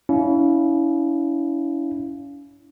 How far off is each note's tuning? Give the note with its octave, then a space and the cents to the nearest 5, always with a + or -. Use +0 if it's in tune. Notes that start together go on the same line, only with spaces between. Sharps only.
C#4 +35 E4 -15 F5 +0